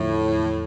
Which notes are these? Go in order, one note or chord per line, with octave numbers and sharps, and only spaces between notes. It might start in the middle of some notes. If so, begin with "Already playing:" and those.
Already playing: E2 A2 D3 F3 A3 E4
E2